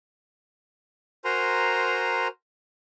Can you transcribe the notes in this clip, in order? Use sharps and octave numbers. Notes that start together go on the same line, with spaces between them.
F#4 A#4 C5 G#5 A#5 C6